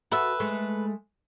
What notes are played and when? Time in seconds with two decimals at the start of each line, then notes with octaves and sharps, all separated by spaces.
0.12 F#4 A4 B4 E5
0.40 G#3 A3